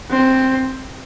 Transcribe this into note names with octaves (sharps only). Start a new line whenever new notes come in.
C4